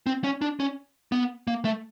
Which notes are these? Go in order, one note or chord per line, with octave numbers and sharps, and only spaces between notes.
C4
C#4
D4
C#4
B3
A#3
A3